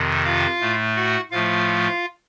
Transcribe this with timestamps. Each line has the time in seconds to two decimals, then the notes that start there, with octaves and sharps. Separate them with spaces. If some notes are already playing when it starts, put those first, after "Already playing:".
Already playing: F2 C3 D#3
0.25 F4 F5
0.60 A2 A3
0.96 F#4 F#5
1.31 A2 F3 A3 F4 F5